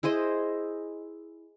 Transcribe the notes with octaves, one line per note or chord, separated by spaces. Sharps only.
E4 G#4 C5 D#5